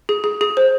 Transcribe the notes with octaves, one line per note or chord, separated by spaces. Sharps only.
G#4
G#4
G#4
C5